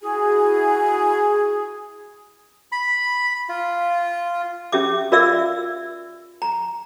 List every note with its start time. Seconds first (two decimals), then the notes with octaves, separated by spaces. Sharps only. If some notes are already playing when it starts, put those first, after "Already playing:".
0.01 E4 F#4 G#4 G#5
2.72 B5
3.49 F4
4.72 C#4 G4 E5 D6
5.12 F4 A#4 D5 E5 F5 E6
6.42 A#5